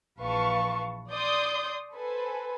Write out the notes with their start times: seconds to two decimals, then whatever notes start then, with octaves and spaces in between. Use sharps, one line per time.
0.20 A#1 E3 B4 F5 A5 C#6
1.09 D5 C6 D#6 G6
1.94 A4 B4 C5 G#5